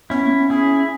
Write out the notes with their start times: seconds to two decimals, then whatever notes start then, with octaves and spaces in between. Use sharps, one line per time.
0.10 B3 C#4 E4
0.24 A#3
0.38 B3
0.50 C#4 E4 G#4